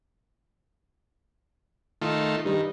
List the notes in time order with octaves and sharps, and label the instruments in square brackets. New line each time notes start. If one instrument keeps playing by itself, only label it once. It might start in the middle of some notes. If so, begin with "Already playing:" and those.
[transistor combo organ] D#3 A3 F4
[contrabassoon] G2 [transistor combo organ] D#3